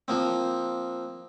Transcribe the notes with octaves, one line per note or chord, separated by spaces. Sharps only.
F3 A#3 C4